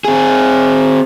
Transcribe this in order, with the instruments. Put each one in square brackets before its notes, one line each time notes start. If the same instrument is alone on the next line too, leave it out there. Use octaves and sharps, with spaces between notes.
[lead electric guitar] C4 G#4